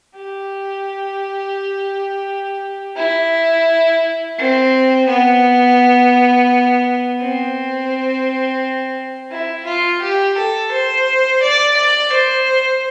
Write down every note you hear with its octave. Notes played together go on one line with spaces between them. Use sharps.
G4
E4
C4
B3
C4
E4
F4
G4
A4
C5
D5
D5
C5